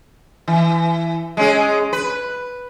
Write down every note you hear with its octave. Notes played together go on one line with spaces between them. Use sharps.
E3
G#3 C#4 G#4
B4